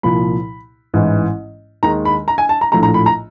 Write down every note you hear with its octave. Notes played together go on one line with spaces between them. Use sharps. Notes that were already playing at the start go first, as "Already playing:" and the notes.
C2 A#2 F3 B5
A1 G#2 E3
D#2 D#3 G#3 A#5
B5
A#5
G#5
A5
A#5
A#1 A2 F3 A3 A#5
A#5
B5
A#5